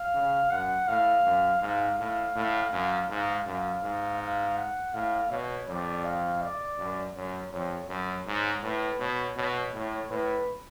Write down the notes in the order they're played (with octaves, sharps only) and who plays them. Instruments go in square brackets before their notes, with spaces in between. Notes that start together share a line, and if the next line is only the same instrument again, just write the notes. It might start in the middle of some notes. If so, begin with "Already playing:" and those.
Already playing: [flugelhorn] F5
[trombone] C#3
[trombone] F#2 [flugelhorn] F#5
[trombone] A2 [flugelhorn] F5
[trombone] F#2
[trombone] G#2 [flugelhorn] F5
[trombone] A2 [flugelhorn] F5
[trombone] A2
[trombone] F#2 [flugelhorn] F5
[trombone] G#2 [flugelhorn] F5
[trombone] F#2 [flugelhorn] F5
[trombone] G#2
[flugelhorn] F5
F#5
[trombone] A2 [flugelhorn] F5
[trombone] B2 [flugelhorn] C#5
[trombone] F2 [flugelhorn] D5
[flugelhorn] F5
D5
[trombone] F#2
[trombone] F#2 [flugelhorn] C#5
[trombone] F2 [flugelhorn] C#5
[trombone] F#2 [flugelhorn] C#5
[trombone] G#2
[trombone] A2 [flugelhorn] B4
[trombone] B2 [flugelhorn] C#5
[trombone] B2 [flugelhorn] C#5
[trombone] A2
[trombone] A2 [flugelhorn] B4